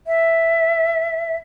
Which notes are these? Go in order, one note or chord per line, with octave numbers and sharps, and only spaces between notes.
E5